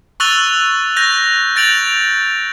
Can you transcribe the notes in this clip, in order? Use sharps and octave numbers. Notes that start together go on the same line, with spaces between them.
C#6 E6 F#6 A6 F7 G7
F#6 G6 A#6 F7
G6 A6 D7 F7 F#7